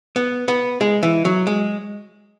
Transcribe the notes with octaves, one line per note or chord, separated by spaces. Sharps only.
B3
B3
G#3
E3
F#3
G#3